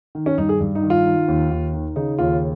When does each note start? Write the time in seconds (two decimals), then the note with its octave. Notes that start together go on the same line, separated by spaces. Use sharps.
0.15 D#3
0.26 C#4
0.38 G2 D#4
0.49 G#4
0.60 G2
0.75 D#4
0.83 D#3
0.90 F4
1.06 D#3
1.28 D#2
1.51 D#2
1.74 D#3
1.96 C#3 D#4
2.19 D#2 F4